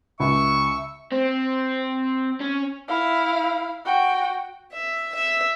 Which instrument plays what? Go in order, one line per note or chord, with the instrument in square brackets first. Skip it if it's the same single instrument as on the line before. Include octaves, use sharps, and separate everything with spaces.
[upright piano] C#2 [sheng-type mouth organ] E5 [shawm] C#6
[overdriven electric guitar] C4
C#4
[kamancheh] E4 F5
F#4 G5
[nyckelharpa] E5
E5